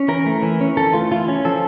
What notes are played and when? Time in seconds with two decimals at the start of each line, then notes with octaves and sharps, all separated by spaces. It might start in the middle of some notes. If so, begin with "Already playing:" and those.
Already playing: C#4
0.08 E3 A#4
0.26 A3
0.43 E3
0.61 C#4
0.77 E3 A4
0.93 A3 F4
1.12 E3 F4
1.28 C#4
1.45 F3 A4